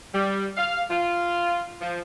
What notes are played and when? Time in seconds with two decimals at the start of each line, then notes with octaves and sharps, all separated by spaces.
0.14 G3
0.57 F5
0.90 F4
1.81 F3